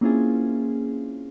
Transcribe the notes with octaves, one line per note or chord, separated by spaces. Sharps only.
A#3 C4 C#4 E4 F4 G#4